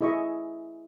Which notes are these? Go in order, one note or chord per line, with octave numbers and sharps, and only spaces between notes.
E4 G#4 D#5 E5 C#6